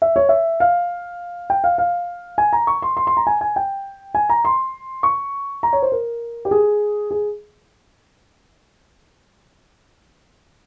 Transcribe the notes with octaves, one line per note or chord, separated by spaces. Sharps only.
E5
C#5
E5
F5
G5
F5
F5
G#5
A#5
C#6
C6
C6
C6
A#5
G#5
G#5
G5
G#5
A#5
C6
C#6
A#5
C#5
C5
A#4
G4
G#4
G#4